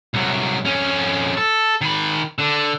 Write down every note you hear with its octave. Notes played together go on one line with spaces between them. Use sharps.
C2 F#3
F2 C#4
A4
D#3 B5
D3